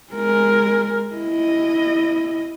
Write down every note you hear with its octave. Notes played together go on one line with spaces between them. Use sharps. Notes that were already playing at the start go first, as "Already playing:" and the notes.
G#3 A#4
E4 D#5